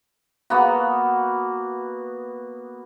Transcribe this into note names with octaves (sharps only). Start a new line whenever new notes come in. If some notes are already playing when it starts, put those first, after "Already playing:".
A#3 B3 F#4